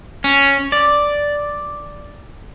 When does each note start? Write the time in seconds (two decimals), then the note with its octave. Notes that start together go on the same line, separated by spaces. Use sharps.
0.24 C#4
0.72 D5